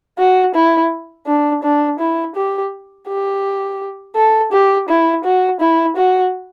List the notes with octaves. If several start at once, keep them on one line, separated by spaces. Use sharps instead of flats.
F#4
E4
D4
D4
E4
G4
G4
A4
G4
E4
F#4
E4
F#4